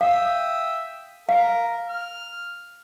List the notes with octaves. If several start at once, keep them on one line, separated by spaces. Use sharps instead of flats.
E5 F5 G5 D#6
A#4 F5
F6